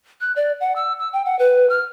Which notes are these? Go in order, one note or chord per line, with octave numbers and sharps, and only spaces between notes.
F#6
D5
F#5
E6
E6
G5
F#5
B4
F6